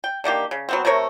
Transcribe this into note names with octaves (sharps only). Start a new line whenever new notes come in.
G5
D3 D#3 A#3 G4
C#3
F#3 B3 C4
C3 A3 A#4 C#5